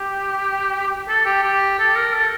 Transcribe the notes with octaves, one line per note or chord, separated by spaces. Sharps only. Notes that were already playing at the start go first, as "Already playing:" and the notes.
Already playing: G4
A4
G4
G4
A4
A#4
A4